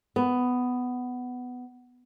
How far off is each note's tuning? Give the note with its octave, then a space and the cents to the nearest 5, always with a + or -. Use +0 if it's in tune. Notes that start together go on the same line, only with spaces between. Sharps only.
B3 +10